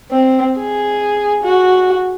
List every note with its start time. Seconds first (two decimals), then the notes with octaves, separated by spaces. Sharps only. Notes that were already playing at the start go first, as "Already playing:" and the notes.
0.11 C4
0.58 G#4
1.43 F#4